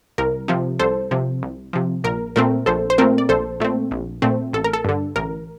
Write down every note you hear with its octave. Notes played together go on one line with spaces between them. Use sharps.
C2 A#4
C3 F3
C2 A4 C5
C3 F3
C2
C3 F3
A#1 A#4
A#2 A3 C4 A#4
A#1 A4 C5
C5
A#2 A3 C4 A#4
D5
A#1 A4 C5
A#2 A3 C4
A#1
A#2 A3 C4
A1 A4
A#4
A4
G2 D3
A1 A#4